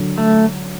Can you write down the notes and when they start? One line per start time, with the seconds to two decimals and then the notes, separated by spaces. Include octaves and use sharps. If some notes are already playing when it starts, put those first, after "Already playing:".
Already playing: D3 F#3
0.18 A3